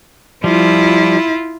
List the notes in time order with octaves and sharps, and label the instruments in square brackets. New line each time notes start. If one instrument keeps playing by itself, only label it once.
[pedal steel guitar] F3 G3 [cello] E4 F4